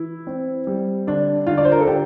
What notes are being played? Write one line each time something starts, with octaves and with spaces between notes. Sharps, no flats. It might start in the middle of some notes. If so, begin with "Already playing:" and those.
Already playing: E3 E4
C4
G3
D3 D4
D3 F4
D5
C5
A#4
A4
D3 G4